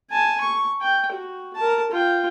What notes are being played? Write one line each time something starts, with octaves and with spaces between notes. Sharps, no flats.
G#5 A5
C#6
G5
F#4
A#4 A5
F4 G5